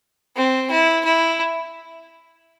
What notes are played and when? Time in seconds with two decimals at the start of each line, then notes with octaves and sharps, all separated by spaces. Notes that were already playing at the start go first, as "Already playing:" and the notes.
0.36 C4
0.71 E4
1.05 E4